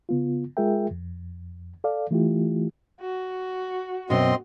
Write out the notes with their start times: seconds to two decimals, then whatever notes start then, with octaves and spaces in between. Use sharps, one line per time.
0.09 C#3 B3 F4
0.57 G#3 F4 G#4 A#4 E5 G5
0.91 F2
1.84 A4 D5 F5
2.11 E3 A3 E4 F4 G4
3.01 F#4
4.10 F#2 B2 C4 D#5 C6